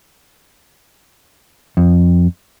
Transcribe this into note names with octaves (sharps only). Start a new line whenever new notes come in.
F2